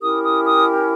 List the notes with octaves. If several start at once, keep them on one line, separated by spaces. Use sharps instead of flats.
C#4 E4 G4 A#4 D#6
D#6
D#6